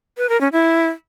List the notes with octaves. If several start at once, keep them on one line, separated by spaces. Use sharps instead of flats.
B4
A#4
C#4
E4